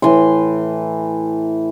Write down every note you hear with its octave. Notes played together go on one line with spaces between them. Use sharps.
A2 E3 C6